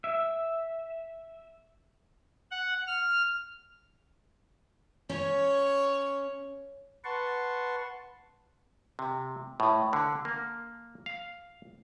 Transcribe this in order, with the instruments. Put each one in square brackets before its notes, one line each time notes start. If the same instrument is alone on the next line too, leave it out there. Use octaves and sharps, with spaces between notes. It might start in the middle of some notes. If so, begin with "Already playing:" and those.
[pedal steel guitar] E5
[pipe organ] F#5
F6
[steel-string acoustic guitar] C#4 [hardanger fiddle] C#5
[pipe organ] B4 F#5 A5 C6 C#6
[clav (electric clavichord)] C3
A2
D3
A#3
F5